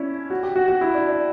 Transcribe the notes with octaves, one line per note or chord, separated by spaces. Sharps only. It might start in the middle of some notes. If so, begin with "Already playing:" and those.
Already playing: C#4 D4 E4
F#4
G4
F#4
F#4
E4
D4
D4